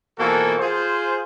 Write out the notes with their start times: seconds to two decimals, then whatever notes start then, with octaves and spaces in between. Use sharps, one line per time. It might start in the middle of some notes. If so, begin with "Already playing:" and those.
0.18 B2 E3 F3 A#3 F#4 A4
0.59 F4 G#4 C5